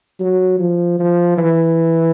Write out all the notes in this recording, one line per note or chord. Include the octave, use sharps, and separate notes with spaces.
F#3
F3
F3
E3